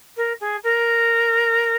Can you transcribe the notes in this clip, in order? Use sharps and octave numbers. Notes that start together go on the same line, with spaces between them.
A#4
G#4
A#4